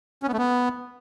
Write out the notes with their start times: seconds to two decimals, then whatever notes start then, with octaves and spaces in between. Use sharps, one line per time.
0.23 C#4
0.28 B3
0.33 A3
0.39 B3